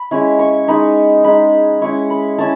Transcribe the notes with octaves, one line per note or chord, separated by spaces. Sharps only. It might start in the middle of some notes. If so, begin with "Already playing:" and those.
Already playing: B5
G#3 C#4 E4
C#6
G#3 D#4 B5
G#3 D#4 B5
G#3 C#4 E4 C#6
B5
C#4 E4 A5